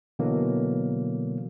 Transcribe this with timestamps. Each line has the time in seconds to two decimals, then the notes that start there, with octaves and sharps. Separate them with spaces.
0.19 B2 D3 E3 F#3 A#3